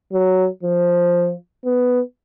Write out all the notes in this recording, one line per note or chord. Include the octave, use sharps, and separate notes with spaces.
F#3
F3
B3